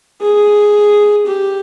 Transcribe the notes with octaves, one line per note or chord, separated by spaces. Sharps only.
G#4
G4